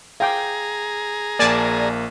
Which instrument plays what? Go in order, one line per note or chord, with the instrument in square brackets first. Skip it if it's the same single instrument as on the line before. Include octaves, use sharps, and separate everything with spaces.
[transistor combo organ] G#4 A#5 [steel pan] F5 G5 D6
[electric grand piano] A#1 A#3 [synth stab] D5 G#5 A5